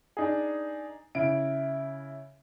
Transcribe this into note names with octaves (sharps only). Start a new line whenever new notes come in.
D4 D#4 G#4
C#3 E4 D7